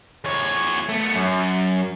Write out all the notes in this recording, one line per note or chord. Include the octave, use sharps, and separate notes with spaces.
E2 C#5
A3 B3
F#2